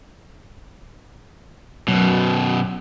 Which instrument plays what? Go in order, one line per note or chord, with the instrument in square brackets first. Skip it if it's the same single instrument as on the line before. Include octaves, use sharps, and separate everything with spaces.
[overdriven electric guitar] F#2 B2 [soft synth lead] F#3